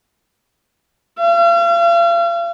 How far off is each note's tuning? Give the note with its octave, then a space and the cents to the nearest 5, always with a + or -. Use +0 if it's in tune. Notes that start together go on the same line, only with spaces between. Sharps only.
F5 -40